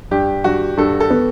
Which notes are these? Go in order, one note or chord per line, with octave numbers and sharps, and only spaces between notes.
G2 G4
G2 F#4
G2 A4
A4
B3